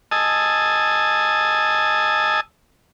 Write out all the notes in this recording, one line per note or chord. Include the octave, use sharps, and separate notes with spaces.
D#5 G#5 A5 D#6 E6